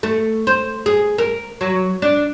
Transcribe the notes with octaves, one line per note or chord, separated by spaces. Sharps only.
A3
C5
G#4
A#4
F#3
D4